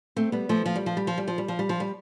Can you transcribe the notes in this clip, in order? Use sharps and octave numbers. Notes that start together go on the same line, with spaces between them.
A3 C4
G3 B3
F3 A3
F3
G3
F3
G3
F3
G3
F3
G3
F3
G3
F3
G3